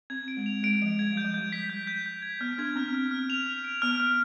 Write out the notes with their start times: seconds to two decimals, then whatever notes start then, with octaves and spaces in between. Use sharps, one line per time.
0.10 C4 G#6
0.28 D7
0.37 G#3
0.46 F7
0.63 G#3 D7
0.82 F3 D7
0.99 G#3 G#6
1.12 G3
1.17 G6
1.24 F3
1.34 G3 G6
1.52 B6
1.70 G6
1.87 G6
2.06 G6
2.22 G#6
2.41 B3 F6
2.58 D4 G#6
2.76 C4 F6
2.94 F6
3.11 F6
3.30 F7
3.46 F6
3.64 D7
3.82 B3 F6
4.00 F6